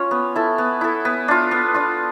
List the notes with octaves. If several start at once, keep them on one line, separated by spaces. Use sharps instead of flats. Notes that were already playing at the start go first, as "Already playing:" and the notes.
Already playing: C#4 F4 C#5
B3
E4 A4
B3
E4 A4
B3
D4 F4
B3
D4 F4